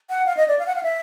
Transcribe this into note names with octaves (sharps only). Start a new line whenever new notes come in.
F#5
F5
D#5
D5
F5
F#5
F5
E5